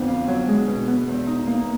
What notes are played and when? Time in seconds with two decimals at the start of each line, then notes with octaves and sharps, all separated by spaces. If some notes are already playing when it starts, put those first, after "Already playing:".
Already playing: F2 D3 B3 D4
0.08 F4
0.28 F#3
0.48 G#3
0.68 B2
0.87 B3
1.08 E2
1.27 D#4
1.47 A#3